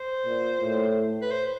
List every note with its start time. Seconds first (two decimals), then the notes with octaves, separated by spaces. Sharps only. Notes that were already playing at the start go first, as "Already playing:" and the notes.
Already playing: C5
0.26 A#2
0.61 A2
1.22 B4
1.32 C5